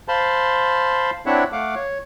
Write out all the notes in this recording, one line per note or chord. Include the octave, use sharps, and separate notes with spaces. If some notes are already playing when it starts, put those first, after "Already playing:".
C5 F5 A5 B5 C6
C4 D4 E4 C#5 E5 F#5
A3 F5 F#5 D6
C#5